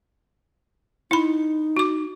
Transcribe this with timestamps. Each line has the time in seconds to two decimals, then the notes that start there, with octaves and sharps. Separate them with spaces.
1.11 D#4 E4 B5
1.77 F#4 D6